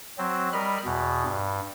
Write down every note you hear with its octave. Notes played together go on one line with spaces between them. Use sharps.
F#3 C4
G3 A#4 D#5 B5 F6
E2 B2
G2